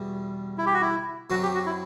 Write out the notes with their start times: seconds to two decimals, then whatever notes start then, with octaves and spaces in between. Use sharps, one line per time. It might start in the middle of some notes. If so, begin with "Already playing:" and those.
Already playing: E2 B2 G3
0.58 E4
0.66 G4
0.74 F#4
0.81 E4
1.30 F#2 F#3 C4 F#4
1.42 G4
1.54 F#4
1.66 E4